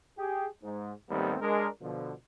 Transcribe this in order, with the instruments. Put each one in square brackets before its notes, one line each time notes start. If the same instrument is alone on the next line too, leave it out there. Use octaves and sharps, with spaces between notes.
[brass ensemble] G4 G#4
G#2
D#2 G#2 G3 A3 B3 C4
G#3 D4 A#4
B2 D3 F3